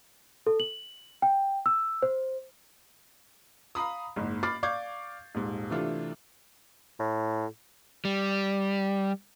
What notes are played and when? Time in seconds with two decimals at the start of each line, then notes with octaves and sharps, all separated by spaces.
0.47 A4
0.60 F#7
1.22 G5
1.66 E6
2.02 C5
3.75 F5 A#5 B5 D#6
4.16 F#1 G#2
4.43 B5 D6 F6 A6 C7
4.63 D5 F5 C#6 D6 G6 G#6
5.35 D#1 G#2
5.70 C3 E3 A3 D4 F4
6.99 A2
8.05 G3